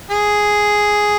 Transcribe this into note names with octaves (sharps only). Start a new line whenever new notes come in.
G#4